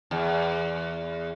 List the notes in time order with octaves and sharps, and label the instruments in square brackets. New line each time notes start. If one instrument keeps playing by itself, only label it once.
[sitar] E2